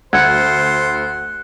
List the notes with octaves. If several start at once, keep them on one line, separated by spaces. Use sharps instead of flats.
D2 C5 F#5 F#6 G#6 C#7